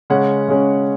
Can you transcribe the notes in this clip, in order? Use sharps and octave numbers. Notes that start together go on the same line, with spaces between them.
C#3 G#3 C#4 F#5
C#3 G#3 C#4